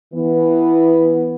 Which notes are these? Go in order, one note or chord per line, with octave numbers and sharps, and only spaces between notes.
E3 B3